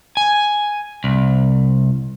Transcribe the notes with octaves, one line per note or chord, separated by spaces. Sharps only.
G#5
C2